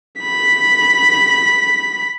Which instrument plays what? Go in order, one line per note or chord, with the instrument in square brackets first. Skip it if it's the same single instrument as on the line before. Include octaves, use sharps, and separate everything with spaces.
[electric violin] B5 B6